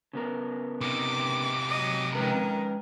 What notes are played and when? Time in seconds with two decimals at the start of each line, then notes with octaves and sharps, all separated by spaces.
0.13 C#3 B3 A#4
0.81 C3 D#4 D6
1.69 F#3 D#5
2.15 D#3 F3 G#3 C#4 A#4 B4